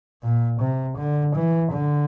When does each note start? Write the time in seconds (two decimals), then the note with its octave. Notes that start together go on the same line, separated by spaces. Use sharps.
0.23 A#2
0.60 C3
0.98 D3
1.35 E3
1.72 D3